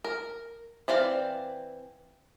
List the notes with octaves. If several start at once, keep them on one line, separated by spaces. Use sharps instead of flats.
A#4
E3 C4 D5 F5